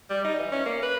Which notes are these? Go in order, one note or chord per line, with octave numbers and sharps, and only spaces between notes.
G3
D#4
E3
C#4
A#3
B4